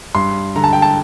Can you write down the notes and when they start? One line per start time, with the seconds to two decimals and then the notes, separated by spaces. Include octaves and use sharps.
0.15 G2 C6
0.56 D3 A#5
0.64 A5
0.73 G5
0.82 A5